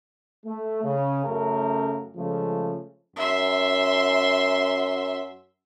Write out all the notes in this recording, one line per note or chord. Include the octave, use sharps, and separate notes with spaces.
A3
C#3
F#2 C#3 A3 A#4
C#3 F3 G#3 A3
F#2 E5 C6